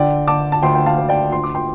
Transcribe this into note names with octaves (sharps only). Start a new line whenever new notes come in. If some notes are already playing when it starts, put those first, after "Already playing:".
Already playing: D3 D5 G5
D3 A5 D6
A5
D2 G5 C6
G5
F5 A5
D2
D5 G5
D2 C6
D6
G5 C6